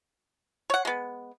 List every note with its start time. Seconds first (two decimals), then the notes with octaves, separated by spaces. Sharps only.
0.70 C#5 F#5
0.85 G#3 B3